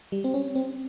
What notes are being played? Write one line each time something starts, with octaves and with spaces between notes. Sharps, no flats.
G3
C4
C#4
C4